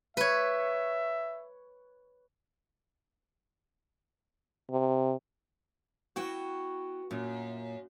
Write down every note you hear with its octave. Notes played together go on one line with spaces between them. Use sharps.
B4 C#5 E5
C3
B3 E4 F#4 G5
F#2 A#2